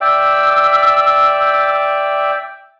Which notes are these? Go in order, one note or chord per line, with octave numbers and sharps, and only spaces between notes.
D5 E5 G5 E6